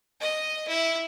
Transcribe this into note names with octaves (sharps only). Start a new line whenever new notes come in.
D#5
E4